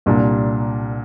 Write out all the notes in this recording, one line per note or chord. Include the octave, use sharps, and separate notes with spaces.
C2 A#2 G3 D4